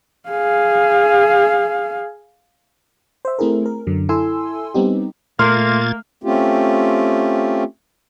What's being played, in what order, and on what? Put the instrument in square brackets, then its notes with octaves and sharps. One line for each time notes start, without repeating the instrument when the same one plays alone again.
[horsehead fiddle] G#4 F5
[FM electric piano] C5 E5
A3 C4 E4 G#4 A#4
A#4
F#2 D3 F#3
E4 A4 G#5 C6 E6
G3 B3 C4 D#4 G4
[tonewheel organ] A#2 G#6 A6 [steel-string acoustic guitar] A3 [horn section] A#3 [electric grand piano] C6 F6
[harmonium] A3 C4 C#4 F4 G4